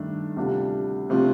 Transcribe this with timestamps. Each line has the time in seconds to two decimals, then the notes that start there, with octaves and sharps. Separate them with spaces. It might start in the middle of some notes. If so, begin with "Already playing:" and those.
Already playing: G2 D#3 A3 D4
0.36 D2 C3 G3 D4 F4
1.10 C3 F3 A3 D4 F4